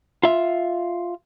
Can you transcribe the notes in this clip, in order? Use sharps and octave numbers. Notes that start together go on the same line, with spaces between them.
F4 E5